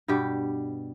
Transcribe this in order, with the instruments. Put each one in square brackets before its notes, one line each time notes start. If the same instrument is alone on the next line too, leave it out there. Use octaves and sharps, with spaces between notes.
[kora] G2 B2 G3 G4